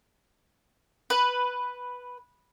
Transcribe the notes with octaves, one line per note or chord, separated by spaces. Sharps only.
B4